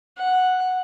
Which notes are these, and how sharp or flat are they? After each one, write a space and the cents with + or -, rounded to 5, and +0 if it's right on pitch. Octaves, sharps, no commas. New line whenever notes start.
F#5 -5